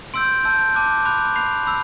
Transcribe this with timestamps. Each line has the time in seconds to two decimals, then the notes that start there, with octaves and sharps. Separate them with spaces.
0.14 C6 E6 G6 D7
0.44 A5 E6 G6
0.74 A5 D6 F#6
1.05 B5 D6 F#6
1.36 B5 F#6 C7
1.67 B5 E6